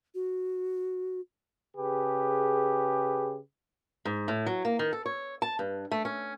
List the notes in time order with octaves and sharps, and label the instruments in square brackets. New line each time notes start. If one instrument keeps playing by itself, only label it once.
[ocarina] F#4
[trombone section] C#3 G4 G#4 B4
[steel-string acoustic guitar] G#2
A2
F#3
A#3
D#3
A4
C#5
A5
G2
A3
C#4